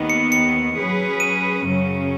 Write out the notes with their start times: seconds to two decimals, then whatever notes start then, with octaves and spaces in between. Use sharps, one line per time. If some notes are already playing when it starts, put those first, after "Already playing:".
Already playing: D#2 D#3 B3
0.10 C#7
0.32 C#7
0.76 F#3 C#4 G#4 B4
1.20 D#7
1.65 F#2 C#3 F#3 C#4